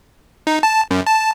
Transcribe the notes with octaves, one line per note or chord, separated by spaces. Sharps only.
D#4
A5
F#2
A5